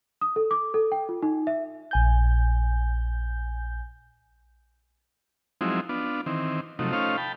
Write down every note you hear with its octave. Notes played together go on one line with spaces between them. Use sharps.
D#6
A4
D6
A4
G5
F4
D#4
E5
A#1 G#5 G6
F3 F#3 G#3 C4 D#4 E4
B3 D4 F4
D#3 E3 C4
C3 F3 F#3 A3 D#4
A3 C#4 D#4 F4 C5 F5
G5 A5 B5